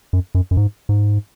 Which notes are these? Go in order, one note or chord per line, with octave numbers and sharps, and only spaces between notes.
F#2
F#2
F#2
G#2
G#2